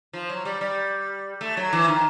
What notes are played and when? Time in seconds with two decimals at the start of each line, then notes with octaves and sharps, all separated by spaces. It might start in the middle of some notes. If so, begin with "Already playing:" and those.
0.13 F3
0.29 F#3
0.45 G3
0.61 G3
1.41 A3
1.57 F#3
1.73 E3
1.88 D#3